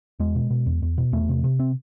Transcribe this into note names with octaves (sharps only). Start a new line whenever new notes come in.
E2 G#3
B2
B2
E2
E2
B2
E2 A3
C3
C3
C4